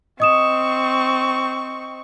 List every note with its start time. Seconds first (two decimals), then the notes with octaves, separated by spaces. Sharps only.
0.20 C4 D#5 C#6 D#6 E7